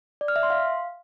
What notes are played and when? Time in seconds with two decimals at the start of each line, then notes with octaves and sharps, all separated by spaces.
0.21 D5
0.28 F6
0.36 E5
0.43 C6
0.50 F5